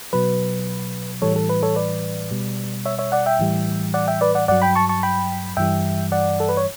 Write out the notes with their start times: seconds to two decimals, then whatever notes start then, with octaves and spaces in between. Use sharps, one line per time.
0.13 B2 F#3 B4
1.22 A2 E3 G3 A4 C#5
1.36 A4
1.49 B4
1.63 A4 C#5
1.76 B4 D5
2.31 B2 G3
2.85 C#5 E5
2.98 C#5 E5
3.12 D5 F#5
3.26 E5 G5
3.39 A2 E3 G3
3.94 D5 F#5
4.08 E5 G5
4.21 B4 D5
4.35 D5 F#5
4.48 G2 F#3 D5 F#5
4.62 G5 B5
4.75 A5 C#6
4.89 A5 C#6
5.03 G5 B5
5.57 G2 E3 G3 E5 G5
6.12 D5 F#5
6.40 A4
6.49 B4
6.57 C#5